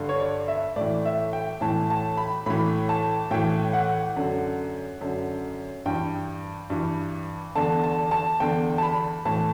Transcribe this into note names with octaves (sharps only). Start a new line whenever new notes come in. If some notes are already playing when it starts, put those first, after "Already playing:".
Already playing: G2 D3
C#5
D5
E5
A2 E3 D5
E5
G5
A2 E3 A5
A5
B5
A2 E3 B5
A5
A2 E3 G5
F#5
F#2 D3
F#2 D3
G2 E3 G5
G2 E3
E2 D3 A5
A5
A5
E2 D3 G5
A5
B5
A2 E3 A5